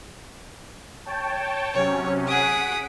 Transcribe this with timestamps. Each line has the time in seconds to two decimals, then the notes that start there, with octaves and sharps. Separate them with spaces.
1.06 C#5 G5 A5
1.74 C3 F#3 C#4 C#5
2.27 G#4 F#5 D#6 B6 D7